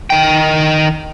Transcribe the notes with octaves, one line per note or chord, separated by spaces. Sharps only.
D#3 G5